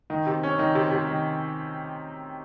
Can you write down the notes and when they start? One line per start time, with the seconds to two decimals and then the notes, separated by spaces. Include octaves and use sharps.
0.10 D#3
0.27 C3
0.43 C#4
0.59 D#3
0.75 C3
0.91 C3
1.08 D#3